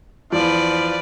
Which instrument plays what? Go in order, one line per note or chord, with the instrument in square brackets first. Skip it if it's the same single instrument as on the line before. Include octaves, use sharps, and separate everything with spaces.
[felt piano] E2 [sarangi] F3 [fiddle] B4 D5